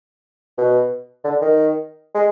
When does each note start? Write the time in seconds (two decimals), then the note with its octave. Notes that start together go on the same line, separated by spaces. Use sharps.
0.58 B2
1.24 D3
1.41 D#3
2.14 G#3